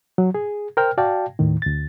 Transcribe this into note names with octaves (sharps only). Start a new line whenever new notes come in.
F#3
G#4
A#4 C5 G5 F6
F#4 D5 F5 G5 A5
D#2 A2 D#3
D2 A6